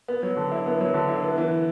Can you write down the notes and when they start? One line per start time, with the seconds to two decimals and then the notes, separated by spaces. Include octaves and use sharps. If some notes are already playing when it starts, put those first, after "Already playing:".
0.08 B3
0.23 F#3
0.37 D3
0.52 E4
0.66 B3
0.81 F#3
0.94 D3
1.09 E4
1.23 B3
1.38 E3